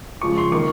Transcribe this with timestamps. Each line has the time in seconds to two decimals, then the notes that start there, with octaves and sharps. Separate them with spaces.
0.22 C#3 F3 G#3 C#6
0.37 C6
0.51 D#3 A#3 C#6